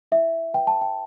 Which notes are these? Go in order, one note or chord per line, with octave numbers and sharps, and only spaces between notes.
E4 E5
B4 G5
A5
G5